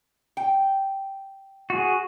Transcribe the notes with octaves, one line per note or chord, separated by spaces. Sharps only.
G5
F#4 G#4